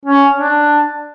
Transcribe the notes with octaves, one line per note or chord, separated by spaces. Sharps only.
C#4
D4